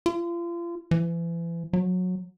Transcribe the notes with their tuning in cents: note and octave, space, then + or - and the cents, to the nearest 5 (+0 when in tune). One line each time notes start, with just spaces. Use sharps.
F4 -35
E3 +35
F#3 -20